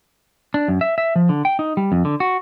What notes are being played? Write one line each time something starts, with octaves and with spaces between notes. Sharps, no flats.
D4
F#2
E5
E5
F3
D3
G5
D#4
G3
F2
D3
F#4